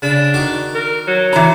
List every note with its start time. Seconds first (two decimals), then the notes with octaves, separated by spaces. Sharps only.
0.02 C#3 D4 B5
0.34 D#3 F#4 D6
0.75 A#4
1.07 F#3
1.33 E3 D5 A#5